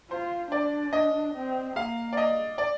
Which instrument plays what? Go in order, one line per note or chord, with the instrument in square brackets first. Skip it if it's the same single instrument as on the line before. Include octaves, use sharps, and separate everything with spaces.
[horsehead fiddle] F4 [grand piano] C5
[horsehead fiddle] D4 [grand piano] D5
[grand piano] D#5
[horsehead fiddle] C4
[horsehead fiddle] A#3 [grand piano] F5
[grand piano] D5
D#5
D5